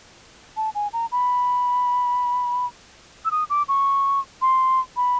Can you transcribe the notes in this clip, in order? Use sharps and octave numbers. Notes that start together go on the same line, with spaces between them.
A5
G#5
A#5
B5
E6
D#6
D6
C#6
C6
B5